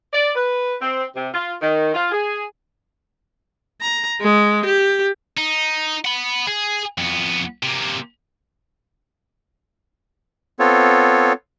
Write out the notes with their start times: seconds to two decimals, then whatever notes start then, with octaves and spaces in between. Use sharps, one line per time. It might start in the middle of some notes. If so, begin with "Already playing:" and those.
0.12 D5
0.36 B4
0.80 C4
1.15 C3
1.34 F4
1.62 D#3
1.93 F4
2.12 G#4
3.81 A#5
4.21 G#3
4.66 G4
5.38 D#4
6.05 F#5 B5
6.47 G#4
6.98 F2 B3
7.63 C3 A#3
10.59 B3 C4 F4 A4 C#5